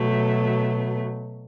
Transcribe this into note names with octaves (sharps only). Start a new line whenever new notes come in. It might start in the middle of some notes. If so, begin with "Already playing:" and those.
Already playing: B2 F#3 A3